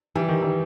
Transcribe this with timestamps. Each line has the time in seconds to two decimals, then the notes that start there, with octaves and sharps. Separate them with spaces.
0.16 E3 G3
0.29 D#3
0.42 E3